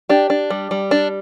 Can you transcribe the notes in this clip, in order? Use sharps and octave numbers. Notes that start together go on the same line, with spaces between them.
D4 G4
D4
G3
G3
D4